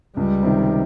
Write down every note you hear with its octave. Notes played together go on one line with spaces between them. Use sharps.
C#2 G3
C3 D#3